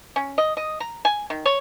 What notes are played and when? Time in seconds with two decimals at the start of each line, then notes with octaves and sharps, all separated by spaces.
0.16 C#4
0.38 D#5
0.57 D#5
0.80 A#5
1.05 G#5
1.30 D#3
1.46 C#5